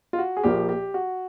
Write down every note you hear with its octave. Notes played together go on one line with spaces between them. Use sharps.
F4
F#4
G#4
A#1 A#2 F3 A#3 G4
G4
F#4